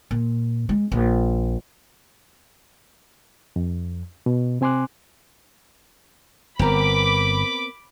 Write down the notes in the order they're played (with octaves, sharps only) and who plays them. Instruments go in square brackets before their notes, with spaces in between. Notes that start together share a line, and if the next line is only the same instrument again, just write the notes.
[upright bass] A#2
G#3
A#1
[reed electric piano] F2
B2
C3 C4 G#5 C6 D6 F#6
[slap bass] G1 [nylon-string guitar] B3 C4 A#4 [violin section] B5 D6